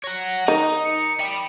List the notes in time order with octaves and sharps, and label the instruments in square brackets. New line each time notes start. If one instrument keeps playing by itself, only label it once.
[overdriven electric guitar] C#5 F#5 [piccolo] A#6
[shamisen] D#3 [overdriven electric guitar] D#4
[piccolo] C#7
[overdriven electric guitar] G5 B5